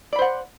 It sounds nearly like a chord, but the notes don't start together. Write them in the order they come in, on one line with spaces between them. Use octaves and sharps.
D5 B5 C5 F#5